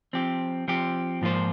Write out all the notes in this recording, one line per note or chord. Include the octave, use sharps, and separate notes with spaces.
F3 C4 G4
F3 C4 G4
G#2 F3 A#3 F4 C5